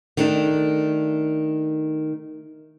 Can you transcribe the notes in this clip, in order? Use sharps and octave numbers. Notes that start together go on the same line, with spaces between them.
D#3 A3 D4